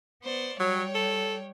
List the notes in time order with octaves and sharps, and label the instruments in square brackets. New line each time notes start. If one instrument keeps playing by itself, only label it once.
[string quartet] B3 C5 D5
[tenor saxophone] F#3 [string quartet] G3 C#5 G5
[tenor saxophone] A4